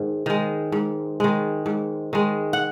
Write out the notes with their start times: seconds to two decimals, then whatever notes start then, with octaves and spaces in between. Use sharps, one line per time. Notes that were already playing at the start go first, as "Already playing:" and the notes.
Already playing: G#2 D#3
0.26 D#3 G#3
0.72 G#2
1.20 D#3 G#3
1.66 G#2
2.13 D#3 G#3
2.53 F#5